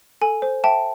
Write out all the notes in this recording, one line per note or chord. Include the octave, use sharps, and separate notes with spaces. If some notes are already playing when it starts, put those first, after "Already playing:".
A4 G#5
C5
E5 G5 A5